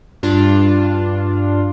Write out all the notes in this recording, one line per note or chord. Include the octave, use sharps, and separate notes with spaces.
G2 D4 F4